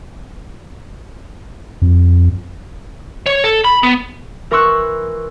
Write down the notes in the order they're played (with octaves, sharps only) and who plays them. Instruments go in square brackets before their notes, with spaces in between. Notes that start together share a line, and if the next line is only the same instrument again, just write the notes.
[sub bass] F2
[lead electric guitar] C#5
A4
B5
B3
[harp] E3 A#4 C6 C#6 E6 F#6